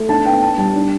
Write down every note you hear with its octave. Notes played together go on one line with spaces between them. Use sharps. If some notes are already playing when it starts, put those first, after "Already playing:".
Already playing: A3
D4 A5
B3 G5
D4 A5
G3 A5
D4